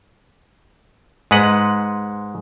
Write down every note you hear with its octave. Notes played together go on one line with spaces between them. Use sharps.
G#2 G#3 B4 F#5